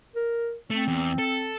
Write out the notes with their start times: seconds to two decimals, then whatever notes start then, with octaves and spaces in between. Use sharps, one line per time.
0.16 A#4
0.70 A3 C4
0.88 E2
1.19 A4